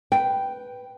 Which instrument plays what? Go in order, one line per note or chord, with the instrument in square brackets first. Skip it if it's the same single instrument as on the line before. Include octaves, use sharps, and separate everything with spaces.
[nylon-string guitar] B4 G5